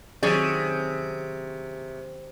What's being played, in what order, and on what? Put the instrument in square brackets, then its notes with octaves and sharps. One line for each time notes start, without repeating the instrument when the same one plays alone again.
[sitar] C3 [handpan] D#3 F#3 C4 [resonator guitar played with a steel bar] C#4 G#4 D5